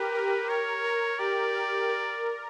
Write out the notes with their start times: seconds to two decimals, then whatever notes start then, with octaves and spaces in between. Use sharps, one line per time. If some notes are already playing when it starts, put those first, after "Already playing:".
Already playing: G4 A#4 B4
0.14 A#4
0.49 A#4 C#5
0.84 A#4
1.19 G4 D5
1.54 A#4
1.89 A#4